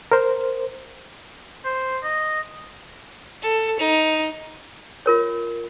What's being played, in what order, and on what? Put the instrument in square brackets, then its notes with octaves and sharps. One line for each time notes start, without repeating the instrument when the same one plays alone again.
[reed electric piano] A#4 C5
[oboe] C5
D#5
[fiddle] A4
D#4
[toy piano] F4 A#4 C#5